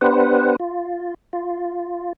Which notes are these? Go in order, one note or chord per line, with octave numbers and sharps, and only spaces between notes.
B3 D4 G4 B4 C5 F#5
F4
F4